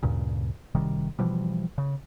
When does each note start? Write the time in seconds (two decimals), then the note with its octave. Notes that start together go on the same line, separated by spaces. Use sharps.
0.03 D2 G2 A#2 C#3
0.75 F#1 C3 D#3 G3
1.19 B2 E3 F3 G3
1.78 C#3